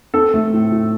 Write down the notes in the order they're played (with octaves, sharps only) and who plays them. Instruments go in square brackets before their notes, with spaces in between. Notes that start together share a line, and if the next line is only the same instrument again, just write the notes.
[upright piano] C4 A4
A3
A2
A2